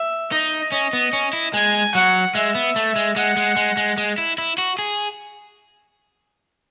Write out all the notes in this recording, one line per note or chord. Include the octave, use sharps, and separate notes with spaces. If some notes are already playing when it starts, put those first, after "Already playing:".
Already playing: E5
D#4 D#5
C#4 D#5
B3
C#4
E4
G#3 G#5
F#3 F#5
G#3 E5
B3
A3
G#3
G#3 F#5
G#3
G#3
G#3
G#3
E4
E4
F#4
G#4